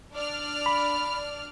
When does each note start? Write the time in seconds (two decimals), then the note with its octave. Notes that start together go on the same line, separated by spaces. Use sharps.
0.13 D4 D5 F6
0.66 B5